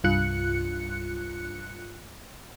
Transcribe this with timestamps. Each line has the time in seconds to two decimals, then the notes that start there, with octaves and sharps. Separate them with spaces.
0.04 C2 G2 F4 F#6 C#7